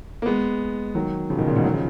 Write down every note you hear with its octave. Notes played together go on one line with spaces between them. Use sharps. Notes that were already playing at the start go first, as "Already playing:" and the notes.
A#3
G#3 B3
D#3 F#3
C#3 F3
B2 D#3
A#2 C#3
G#2 B2
D#3 F#3
C#3 F3